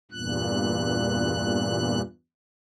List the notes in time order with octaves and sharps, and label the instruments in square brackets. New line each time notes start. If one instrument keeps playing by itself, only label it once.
[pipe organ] E2 G2 A#2 F#6